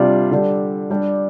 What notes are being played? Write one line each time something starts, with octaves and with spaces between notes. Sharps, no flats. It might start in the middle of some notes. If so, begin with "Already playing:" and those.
Already playing: C3 G3 D4 F4
D3 G3 D4 G4
G3 D4 G4